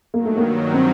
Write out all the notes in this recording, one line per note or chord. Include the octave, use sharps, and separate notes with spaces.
G2 D#3 F#3 A#3
A3
A#3
C4